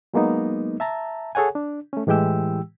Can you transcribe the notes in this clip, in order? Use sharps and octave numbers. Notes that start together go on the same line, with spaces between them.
F#3 G#3 A#3 B3 D#4
E5 A5 A#5
G#4 A4 C#5 F#5 G#5
D4
A3 C#4
A2 E3 G#3 G4 G5 E6